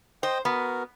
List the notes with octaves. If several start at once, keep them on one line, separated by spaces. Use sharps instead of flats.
C5 D#5 G5
B3 F#4 A#4